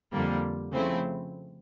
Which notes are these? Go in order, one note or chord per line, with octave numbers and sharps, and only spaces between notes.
F2 D3 G3 A#3
C#3 F3 A3 C4 E4